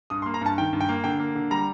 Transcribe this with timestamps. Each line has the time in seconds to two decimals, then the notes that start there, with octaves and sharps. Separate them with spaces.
0.10 G2 D#6
0.22 C6
0.26 A#3
0.34 A#5
0.41 G2 A5
0.58 D#3 G5
0.73 G2
0.81 G5
0.89 A#3
1.04 D3 G5
1.20 A#3
1.35 D3
1.51 G3 A#5